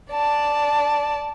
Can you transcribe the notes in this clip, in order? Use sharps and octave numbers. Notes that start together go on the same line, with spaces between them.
D5 A5